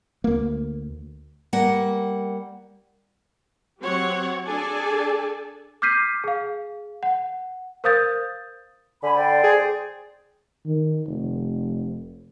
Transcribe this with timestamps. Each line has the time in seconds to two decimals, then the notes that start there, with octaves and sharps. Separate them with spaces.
0.24 D2 A#3
1.53 G3 A#3 F#5
3.80 F#3 C4 G4 C#5 F#5
4.46 D4 G#4 A4 D5 G#5 A5
5.82 D6 F6 G6 B6 C7 D#7
6.24 G#4 F5
7.03 F#5
7.84 A#4 C5 F5 D#6 G6 A6
9.03 D3 G#5 B5
9.15 C5 D5 G5
9.44 G#4
10.66 D#3
11.07 F1